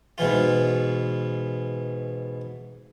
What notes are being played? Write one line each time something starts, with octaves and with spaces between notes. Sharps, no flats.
G#2 B2 E3 F4